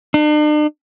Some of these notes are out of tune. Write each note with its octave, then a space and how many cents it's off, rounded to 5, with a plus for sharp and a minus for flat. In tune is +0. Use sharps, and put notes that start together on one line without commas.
D4 +45